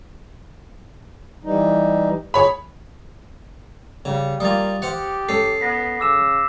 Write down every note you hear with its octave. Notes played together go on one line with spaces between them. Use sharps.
E3 G3 D#4
G#4 C#5 B5
C#3 G3
G3 A#3 F4 D#6 A6
G4 C5 F5 F#5
C#4 A4 C7
B3 A#6 B6
C#3 D6 E6 E7